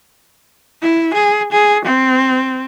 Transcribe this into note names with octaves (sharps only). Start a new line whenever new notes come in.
E4
G#4
G#4
C4